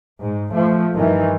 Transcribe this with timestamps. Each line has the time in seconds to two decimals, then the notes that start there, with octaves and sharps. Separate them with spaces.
0.21 G#2
0.53 F3 A3
0.94 G2 D#3 E3